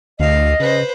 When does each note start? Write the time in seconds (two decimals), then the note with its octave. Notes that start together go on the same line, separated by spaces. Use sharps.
0.20 D2 D#5 F5
0.60 C#3 B4 C5